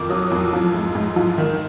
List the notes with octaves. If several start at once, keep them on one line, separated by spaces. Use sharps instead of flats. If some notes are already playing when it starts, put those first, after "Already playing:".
Already playing: F2 D#3 D6
F#3 D#6
F2
F3
G#2
G#2
F3
D#3